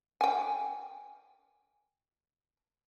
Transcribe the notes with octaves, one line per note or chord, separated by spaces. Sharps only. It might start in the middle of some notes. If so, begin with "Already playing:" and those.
G5 G#5